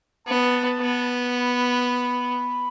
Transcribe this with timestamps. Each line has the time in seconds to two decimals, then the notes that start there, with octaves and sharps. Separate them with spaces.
0.27 B3 A5
0.81 B3
1.35 B5